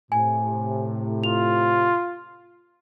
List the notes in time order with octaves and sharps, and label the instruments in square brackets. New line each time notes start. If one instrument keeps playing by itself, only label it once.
[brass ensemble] A2 C3 [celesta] G#5
[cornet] F4 [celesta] F7